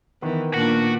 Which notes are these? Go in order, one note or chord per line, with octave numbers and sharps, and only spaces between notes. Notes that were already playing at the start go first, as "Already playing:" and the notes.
D#3 E3 B3
A#2 D4 F#4